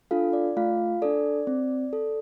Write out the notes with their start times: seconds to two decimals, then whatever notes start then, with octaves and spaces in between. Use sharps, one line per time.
0.11 D4 F4 A4 F5
0.33 D5
0.57 A3 F4 F5
1.02 D4 A4 D5
1.47 C4
1.93 A4